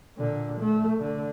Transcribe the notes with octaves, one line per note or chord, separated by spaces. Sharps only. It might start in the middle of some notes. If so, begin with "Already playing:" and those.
A#2 D3
A3
D3